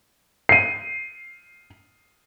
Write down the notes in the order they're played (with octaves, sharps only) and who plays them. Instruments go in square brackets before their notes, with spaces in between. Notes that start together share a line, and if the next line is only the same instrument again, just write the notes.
[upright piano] C7 D#7